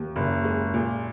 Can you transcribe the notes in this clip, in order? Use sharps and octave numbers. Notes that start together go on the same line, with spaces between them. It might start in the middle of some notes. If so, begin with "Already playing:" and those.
Already playing: D#2
F#1
G#3
A#2